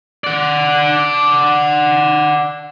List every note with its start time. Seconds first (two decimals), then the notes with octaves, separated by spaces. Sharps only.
0.24 D5 F#5